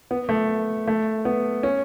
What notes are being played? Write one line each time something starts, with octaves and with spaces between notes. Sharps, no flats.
B3
A3
A3
B3
C#4